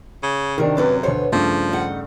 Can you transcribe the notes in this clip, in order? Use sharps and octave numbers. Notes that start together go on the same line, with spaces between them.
C#3
C3 D#3 D4 F#4 A#4
F#2 C3 C#4 B4 D5
D2 B2 B3 C5 C#5
G2 C#3 F3 A3 D4
D#4 D#5 F#5